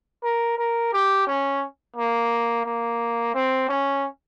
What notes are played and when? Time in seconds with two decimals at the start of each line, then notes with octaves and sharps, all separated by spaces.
0.23 A#4
0.58 A#4
0.93 G4
1.27 C#4
1.96 A#3
2.65 A#3
3.34 C4
3.69 C#4